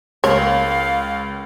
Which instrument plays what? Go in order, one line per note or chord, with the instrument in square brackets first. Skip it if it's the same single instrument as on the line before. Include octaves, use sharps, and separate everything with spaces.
[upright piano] C#2 A#3 [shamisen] C#5 [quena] F5